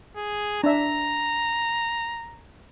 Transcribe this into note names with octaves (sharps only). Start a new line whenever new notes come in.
G#4
D4 E5 A#5